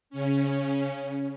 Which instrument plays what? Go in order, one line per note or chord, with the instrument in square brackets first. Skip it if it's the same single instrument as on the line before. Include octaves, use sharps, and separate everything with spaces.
[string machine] C#3 C#4